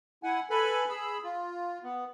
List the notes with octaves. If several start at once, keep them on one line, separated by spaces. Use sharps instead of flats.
E4 F#5 G#5
A4 B4 G#5 B5
G#4 B5 E6
F4
B3